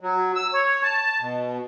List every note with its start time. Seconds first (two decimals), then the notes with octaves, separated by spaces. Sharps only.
0.01 F#3
0.35 E6
0.53 C#5
0.83 A5
1.21 B2